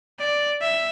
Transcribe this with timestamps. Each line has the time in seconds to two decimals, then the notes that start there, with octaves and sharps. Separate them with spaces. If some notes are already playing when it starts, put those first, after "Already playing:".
0.20 D5
0.62 E5